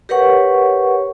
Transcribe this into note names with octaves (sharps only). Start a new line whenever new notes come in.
G4 A#4 B4 C#5 F#5 C#6